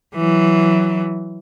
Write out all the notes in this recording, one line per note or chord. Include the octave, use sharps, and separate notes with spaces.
E3 F#3